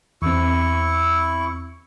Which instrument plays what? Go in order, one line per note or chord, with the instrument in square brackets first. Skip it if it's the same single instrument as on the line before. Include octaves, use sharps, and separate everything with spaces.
[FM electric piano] E2 C4 [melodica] E4 C#6